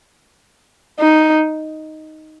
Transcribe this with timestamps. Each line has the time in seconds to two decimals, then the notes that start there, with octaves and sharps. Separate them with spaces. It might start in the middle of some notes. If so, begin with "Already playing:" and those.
1.00 D#4